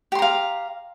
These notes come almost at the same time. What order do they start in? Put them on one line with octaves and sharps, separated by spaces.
G4 C6 A#5 F5